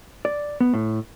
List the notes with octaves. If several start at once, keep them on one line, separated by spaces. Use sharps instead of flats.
D5
B3
A2